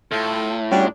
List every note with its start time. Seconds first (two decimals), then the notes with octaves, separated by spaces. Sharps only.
0.12 A2 F4 A4
0.71 G#2 G3 G#3 C#4 D4 F#4 C#5